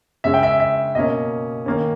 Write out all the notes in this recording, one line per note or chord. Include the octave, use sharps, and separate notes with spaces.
C#3 G#3 C#4 E5
G5
E5
E5
B2 A#3 C#4 D#5
D#3 A#3 C#4